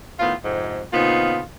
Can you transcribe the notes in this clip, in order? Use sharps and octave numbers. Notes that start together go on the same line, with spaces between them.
A2 D#3 B3 F4
F2 G#2 C3
A#2 C#3 B3 C4 D#4 F4